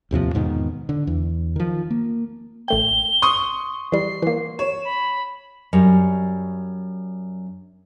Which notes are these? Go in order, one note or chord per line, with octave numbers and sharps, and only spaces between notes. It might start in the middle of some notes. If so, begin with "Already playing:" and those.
A1 D#2 C3 F3
E2 G#2 B2 D#3
D3
E2
D#3 F3
A#3
A1 A3 G5 G7
C6 C#6 D#6
E3 G3 C7
E3 A#3
C#5 E7
B5
F#2 G3